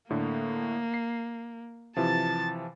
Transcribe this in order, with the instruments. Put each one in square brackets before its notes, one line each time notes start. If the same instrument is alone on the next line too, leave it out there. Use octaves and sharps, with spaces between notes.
[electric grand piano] A2 D3 [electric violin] A#3
[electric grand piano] C7
[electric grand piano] C3 E3 F3 [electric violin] A5 A6